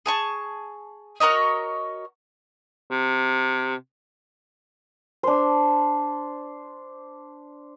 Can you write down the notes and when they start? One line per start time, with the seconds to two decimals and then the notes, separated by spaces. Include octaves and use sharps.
0.06 G#4 A5 C#6
1.20 F#4 A#4 C#5 D#5
2.91 C3
5.23 D4 C5